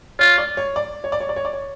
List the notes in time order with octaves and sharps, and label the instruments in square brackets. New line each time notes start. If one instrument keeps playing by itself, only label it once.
[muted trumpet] F4 [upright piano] C#5
[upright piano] D5
C#5
D5
C#5
D5
C#5
D5
C#5
D5
C#5